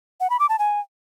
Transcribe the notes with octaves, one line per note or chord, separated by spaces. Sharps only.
F#5
B5
D6
A5
G#5